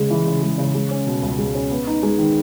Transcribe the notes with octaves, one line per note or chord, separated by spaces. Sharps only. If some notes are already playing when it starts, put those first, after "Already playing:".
Already playing: C#3 G#3
E3
C#3
G#3
C#3
G#3
C#4
B2
C#2
G#3
C#4
B3
D#4
G#3
D#3